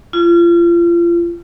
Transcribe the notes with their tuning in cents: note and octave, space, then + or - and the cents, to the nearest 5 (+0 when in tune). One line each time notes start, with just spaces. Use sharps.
F4 -35